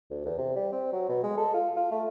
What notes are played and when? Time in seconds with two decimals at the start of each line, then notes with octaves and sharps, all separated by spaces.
0.11 D2
0.26 E2
0.38 C3
0.56 G3
0.72 C4
0.93 F#3
1.09 B2
1.23 G#3
1.37 A4
1.54 F4
1.77 F4
1.91 A3